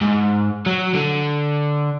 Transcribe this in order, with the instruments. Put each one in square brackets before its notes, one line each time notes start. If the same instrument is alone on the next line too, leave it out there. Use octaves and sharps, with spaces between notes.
[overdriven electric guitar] G#2
F#3
D3